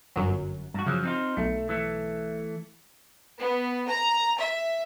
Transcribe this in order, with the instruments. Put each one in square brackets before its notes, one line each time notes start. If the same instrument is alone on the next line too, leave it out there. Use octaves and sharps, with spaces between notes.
[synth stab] G1 F#2 F#3
[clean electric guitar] G2 F#4
[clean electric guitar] F#2 F3 F#3 [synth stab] C#3
[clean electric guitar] C4 D#4 F4
[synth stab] B1 [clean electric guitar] A3
[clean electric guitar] E3 A3
[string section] B3
A#5
E5